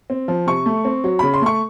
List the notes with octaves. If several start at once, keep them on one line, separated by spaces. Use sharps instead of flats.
C4
F3
C3 C#6
A3
C4
F#3
C#3 B5
C6
A3 C#6